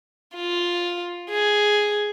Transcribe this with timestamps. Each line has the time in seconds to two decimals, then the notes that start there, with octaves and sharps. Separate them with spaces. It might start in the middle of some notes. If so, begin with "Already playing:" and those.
0.36 F4
1.30 G#4